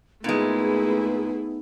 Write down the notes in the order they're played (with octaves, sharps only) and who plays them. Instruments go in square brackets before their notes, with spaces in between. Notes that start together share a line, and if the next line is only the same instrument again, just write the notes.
[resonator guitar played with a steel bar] A#2 G#3 [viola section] A3 E4 G#4 [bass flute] B3 [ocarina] D#4